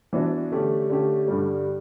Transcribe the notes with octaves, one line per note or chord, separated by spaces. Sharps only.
E3 B3 D4 F#4
D3 A3 C#4 G4
D3 A3 C#4 G4
G2 D3 G3